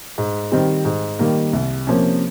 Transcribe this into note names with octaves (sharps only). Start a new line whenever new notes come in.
G#2
D#3 G3 C4
G#2
D#3 G3 A#3
C2
C3 F3 A#3 C#4